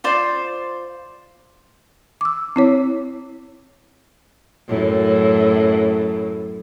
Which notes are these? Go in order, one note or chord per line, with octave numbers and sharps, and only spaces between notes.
F4 C5 D5
D6 E6
C4 E4 C#5
F#2 A2